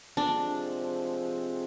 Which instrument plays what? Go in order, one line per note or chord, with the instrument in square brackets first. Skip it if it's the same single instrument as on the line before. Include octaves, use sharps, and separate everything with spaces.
[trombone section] C3 F3 G#3 C4 [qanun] D4